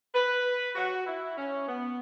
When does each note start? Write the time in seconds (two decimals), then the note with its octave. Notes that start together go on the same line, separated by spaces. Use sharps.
0.15 B4
0.75 F#4
1.06 E4
1.37 C#4
1.68 B3